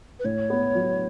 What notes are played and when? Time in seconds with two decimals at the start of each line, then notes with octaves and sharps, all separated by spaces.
0.19 B4
0.24 A2 C#5
0.50 B3
0.75 F#3